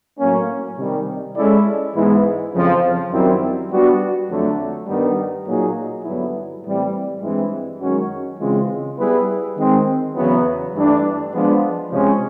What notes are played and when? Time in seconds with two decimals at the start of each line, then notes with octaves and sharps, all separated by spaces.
0.17 A2 F#3 A#3 C#4
0.77 C3 D#3 G3
1.35 G#3 C#4 E4 A4 D5
1.93 G#2 E3 G#3 B3 E4
2.52 F2 C#3 F3
3.10 F#2 D#3 G3 C4 E4
3.69 G3 B3 D4 F#4
4.28 F2 D3 F#3 A3
4.87 G2 D#3 G3 B3
5.45 A#2 F#3 A#3 D#4 G#4
6.04 G2 D3 F#3 B3 E4
6.63 A2 E3 G3 C4
7.21 G2 E3 G#3 C4 E4
7.80 F#2 D#3 G#3 C#4 F#4
8.39 C#3 E3 G#3 C4 F4
8.97 G3 B3 E4 G#4 B4
9.56 D#3 G#3 C4
10.15 E2 C#3 F#3 B3 E4
10.74 G2 E3 A3 D4
11.32 F3 G#3 B3 D4 F4
11.91 C3 F3 G#3 C#4